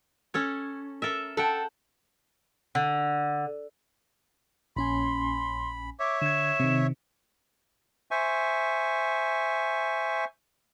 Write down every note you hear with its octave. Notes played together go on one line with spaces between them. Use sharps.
C#4 A4 C#5
A4 A#4 E5
A4 E5 F#5 G5
D3
A#1 C#4 G#5 B5 C6
C#5 E5 D6
D3 G#6 E7
C3 D#3
C5 E5 G#5 C#6